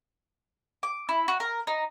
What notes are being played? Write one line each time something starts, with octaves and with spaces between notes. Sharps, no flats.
D6
E4
F#4
A#4
D#4